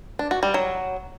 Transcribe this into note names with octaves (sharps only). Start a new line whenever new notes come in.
D4
F#4
G3
F#3